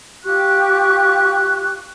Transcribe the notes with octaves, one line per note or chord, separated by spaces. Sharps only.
F4 G4 C#6 F#6